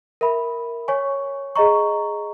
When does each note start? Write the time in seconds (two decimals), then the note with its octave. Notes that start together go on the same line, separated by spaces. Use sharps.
0.21 A#4 E5 B5
0.88 C#5 G#5 C#6
1.55 G#4 D#5 A#5 C#6